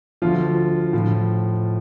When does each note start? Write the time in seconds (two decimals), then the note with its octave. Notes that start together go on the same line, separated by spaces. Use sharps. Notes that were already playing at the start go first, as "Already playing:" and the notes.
0.22 D2 D3 F3 F4
0.93 A2 F3